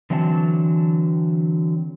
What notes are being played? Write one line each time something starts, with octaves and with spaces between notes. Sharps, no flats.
D3 E3 F#3 C4 D#5 A5